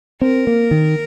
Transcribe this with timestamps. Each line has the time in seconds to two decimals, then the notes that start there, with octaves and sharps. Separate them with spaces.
0.22 C4 A#4
0.47 A#3
0.71 D#3